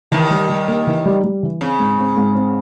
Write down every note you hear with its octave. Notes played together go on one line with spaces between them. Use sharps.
D#2 D#3 E3
G3
G3
A#3
E3
G3
G3
E3
C#3 C4
G#2
C4
G#2
C4